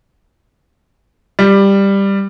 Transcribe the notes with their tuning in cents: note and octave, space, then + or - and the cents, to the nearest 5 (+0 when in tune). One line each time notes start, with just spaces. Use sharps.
G3 +10